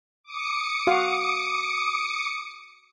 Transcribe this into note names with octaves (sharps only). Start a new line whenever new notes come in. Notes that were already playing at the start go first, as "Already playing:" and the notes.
D6 D#6 C#7
F#4 F5